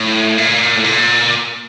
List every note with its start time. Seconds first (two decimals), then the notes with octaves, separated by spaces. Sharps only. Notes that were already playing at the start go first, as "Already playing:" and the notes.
Already playing: A2
0.38 A#2
0.76 A2
0.84 A#2